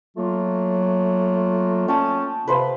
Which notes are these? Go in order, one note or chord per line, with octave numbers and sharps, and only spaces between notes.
F#3 A3 A#3 F4
C#4 G5 A5 D#6
C3 B4 C5 F5